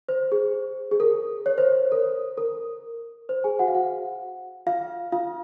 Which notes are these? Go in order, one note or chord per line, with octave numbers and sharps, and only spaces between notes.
C5
G#4
G#4
A#4
C#5
C5
A#4
A#4
C5
G#4 G#5
F#4 F#5
F5
F#4 F#5
F4 F5
F4 F5